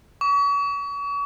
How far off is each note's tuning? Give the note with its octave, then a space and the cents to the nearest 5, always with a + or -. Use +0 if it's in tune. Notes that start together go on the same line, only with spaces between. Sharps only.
C#6 +40